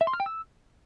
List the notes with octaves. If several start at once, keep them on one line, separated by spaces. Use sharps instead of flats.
E5
C6
F6
G5
E6